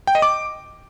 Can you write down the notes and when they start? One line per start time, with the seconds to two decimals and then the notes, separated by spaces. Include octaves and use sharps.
0.07 G5
0.15 D#5
0.22 D6